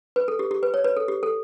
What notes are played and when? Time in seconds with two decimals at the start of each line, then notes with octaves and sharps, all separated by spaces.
0.16 B4
0.28 A4
0.39 G4
0.51 G4
0.63 B4
0.74 C#5
0.84 B4
0.97 A4
1.08 G4
1.23 A4